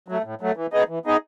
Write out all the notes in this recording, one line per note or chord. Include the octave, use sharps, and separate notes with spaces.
F#3 A3
A2
F#3 A3
E3
B3 D#4 G#4 D#5
E3
B3 D#4 G#4 D#5